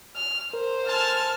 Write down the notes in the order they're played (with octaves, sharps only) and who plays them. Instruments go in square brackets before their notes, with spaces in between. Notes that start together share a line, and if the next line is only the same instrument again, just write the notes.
[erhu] F6
[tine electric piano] A#4 [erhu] C5
[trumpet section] A4 G#5 A5 [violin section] F6